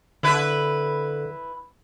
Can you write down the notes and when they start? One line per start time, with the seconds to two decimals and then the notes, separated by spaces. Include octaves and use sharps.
0.23 D3 E4 B4